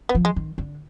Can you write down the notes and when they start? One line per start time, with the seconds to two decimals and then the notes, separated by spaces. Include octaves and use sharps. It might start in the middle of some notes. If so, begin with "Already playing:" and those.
0.09 B3
0.15 F3
0.25 G#3
0.36 D#3
0.58 D3